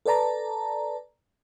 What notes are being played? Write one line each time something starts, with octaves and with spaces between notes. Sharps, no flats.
A4 B4 D5 A5 A#5